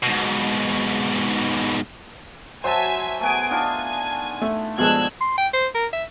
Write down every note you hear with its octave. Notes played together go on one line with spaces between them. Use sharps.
G#2 B2
F#3 C5 E5 G#5 A5
A3 B3 G#4 G#5 D7
D4 D#4 F4 G#5
A3
G2 B2 F3 G#3 A4 E6 F#6 G#6
C6
G5
C5
A#4
E5